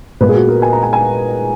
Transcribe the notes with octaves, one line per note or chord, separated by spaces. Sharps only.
A#2 G#3 B3 B4
G#4
F#4
A#4
G#5
A#5
G#5
G#5